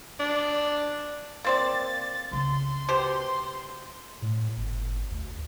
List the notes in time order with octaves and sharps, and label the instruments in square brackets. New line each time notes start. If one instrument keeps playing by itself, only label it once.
[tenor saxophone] D4
[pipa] A#3 C4 D5 [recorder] A6
[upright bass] C#2 C#3 [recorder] C6
[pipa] B2 G4 C5
[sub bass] A2
G1
D2